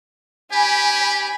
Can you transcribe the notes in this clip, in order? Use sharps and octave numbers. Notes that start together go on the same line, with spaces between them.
G4 G#5 B5